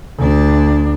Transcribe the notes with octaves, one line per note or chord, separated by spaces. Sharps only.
D2 D4